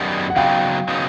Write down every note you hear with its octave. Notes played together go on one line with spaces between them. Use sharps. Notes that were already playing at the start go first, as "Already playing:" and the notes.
Already playing: F#2 D#3 G3 B3
F#5
C#3 F#3 B3 D#4 F5 G5
C#3 F#3 B3 D#4